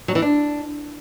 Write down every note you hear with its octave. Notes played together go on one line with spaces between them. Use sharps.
F#3
E3
D4